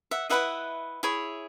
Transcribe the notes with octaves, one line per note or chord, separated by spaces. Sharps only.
E5 F#5
E4 G#4 B4 D#5 E5 F#5
E4 G#4 C#5